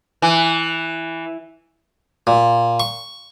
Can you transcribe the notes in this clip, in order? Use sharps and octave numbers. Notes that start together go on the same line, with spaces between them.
E3
A#2
C#6